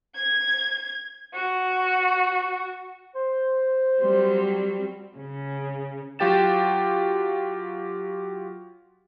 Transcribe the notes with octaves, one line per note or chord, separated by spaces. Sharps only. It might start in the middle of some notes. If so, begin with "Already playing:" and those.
G#6
F#4
C5
F#3 G3 C4
C#3 C#4
F#3 F4 G4 G5 A6 E7